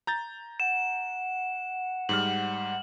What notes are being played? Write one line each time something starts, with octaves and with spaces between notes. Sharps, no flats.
A#5 G6 A6
F#5 E7
G#2 G3 F6 F#7